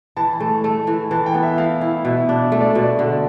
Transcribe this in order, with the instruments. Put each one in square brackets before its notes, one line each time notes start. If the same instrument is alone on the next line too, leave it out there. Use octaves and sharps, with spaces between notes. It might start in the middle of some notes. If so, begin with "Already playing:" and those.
[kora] E3 [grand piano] A5
[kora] A3
A3
E3
[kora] E3 [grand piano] A5
[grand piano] G5
[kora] B3
[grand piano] E5
[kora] E3 [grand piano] F5
[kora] E4
[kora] B2 [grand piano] E5
[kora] D4
[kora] A3 [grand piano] E5
[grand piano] D5
[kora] B2 [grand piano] D5
[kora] D3